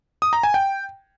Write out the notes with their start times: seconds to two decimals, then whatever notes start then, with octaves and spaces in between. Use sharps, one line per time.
0.22 D#6
0.33 A#5
0.43 G#5
0.54 G5